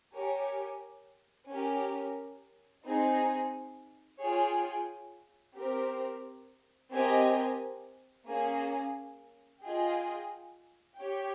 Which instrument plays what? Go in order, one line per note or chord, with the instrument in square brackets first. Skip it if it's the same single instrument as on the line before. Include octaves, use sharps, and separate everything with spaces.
[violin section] G4 A#4 C#5 G#5
C#4 G4 A#4
C4 D#4 G#4
F4 G#4 C#5 G5
C4 G4 A#4
C4 G4 A#4 D#5 G#5
A#3 C#4 G#4
F4 G#4 D#5 G5
G4 C#5 G5